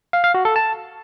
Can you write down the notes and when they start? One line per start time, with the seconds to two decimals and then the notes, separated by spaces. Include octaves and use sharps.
0.13 F5
0.24 F5
0.34 F#4
0.45 A4
0.56 A5